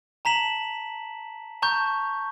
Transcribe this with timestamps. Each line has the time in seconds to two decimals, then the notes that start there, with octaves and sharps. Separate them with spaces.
0.25 A5 A#5 B6 E7 F#7
1.62 A5 A#5 C#6 G6